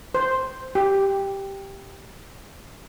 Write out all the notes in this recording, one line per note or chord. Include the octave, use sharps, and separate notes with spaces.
C5
G4